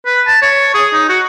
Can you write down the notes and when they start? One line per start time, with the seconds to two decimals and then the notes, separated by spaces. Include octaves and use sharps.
0.06 B4
0.27 A5
0.42 C#5
0.74 G#4
0.93 D#4
1.09 F#4